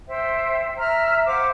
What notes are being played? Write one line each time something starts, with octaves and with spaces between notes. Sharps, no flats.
C5 E5 G5
E5 A#5 F6
C5 F5 F#5 D6